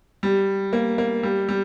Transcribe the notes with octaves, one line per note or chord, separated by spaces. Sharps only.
G3
A#3
A#3
G3
G3